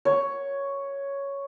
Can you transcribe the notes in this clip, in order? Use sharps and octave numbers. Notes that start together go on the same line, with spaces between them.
C#5